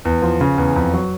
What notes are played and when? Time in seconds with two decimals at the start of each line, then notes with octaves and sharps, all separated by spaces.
0.05 E2
0.22 F3
0.41 C#3
0.58 E2
0.76 F2
0.94 F#3